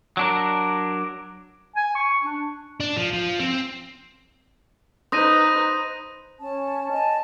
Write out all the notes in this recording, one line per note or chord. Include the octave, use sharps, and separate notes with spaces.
F#3 D4 A#4
G#5
C#6
D4
D4
F3
F3
C4
D#4 B4 C5 D#6 A#6 D#7
C#4 A5
D#5 G#5 A5